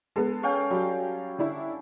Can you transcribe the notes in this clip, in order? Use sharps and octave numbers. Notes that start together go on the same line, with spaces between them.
G#3 B3 A4
C#4 F5 G5
F#3 G3
D3 D4 E4